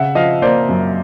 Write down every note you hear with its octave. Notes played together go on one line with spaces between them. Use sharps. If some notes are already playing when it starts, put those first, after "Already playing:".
Already playing: C#3 E5 F#5
F3 D#5 F5
A#3 C5 D5
F#2